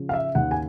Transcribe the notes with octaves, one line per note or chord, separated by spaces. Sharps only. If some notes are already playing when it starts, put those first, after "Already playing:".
Already playing: C#3 F3
F5
E5
D#2 F#5
G#5